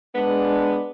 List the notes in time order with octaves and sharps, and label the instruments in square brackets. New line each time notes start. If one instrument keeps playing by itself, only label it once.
[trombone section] G#3 D4 [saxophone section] B3